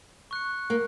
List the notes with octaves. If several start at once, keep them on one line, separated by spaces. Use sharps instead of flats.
C#6 F#6 C#7
A#3